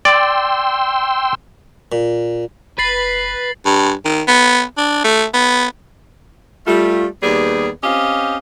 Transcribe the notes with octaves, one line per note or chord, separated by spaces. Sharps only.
D5 G5 C6 E6
A#2
F#1 B4 A6 C7 F#7
G2
D#3
B3
D4
A3
B3
G3 A3 F4
D#2 G3 B3 G#4 B4 D5
C4 C#4 G4 D#5 F5